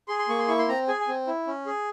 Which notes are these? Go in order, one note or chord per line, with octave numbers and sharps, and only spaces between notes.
G#4 C6
C6
A#3 C#6
C6
E4 C#6
C6
C4 A#5
G#4 G#5
G#5
C4
E4
C#4
G#4